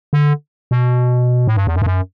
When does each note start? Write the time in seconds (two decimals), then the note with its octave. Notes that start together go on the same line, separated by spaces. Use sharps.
0.13 D3
0.71 B2
1.47 A2
1.56 G2
1.67 E2
1.76 F#2
1.82 G2
1.86 F#2